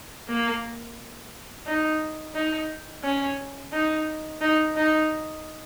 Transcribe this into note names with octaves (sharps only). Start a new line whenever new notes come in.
A#3
D#4
D#4
C#4
D#4
D#4
D#4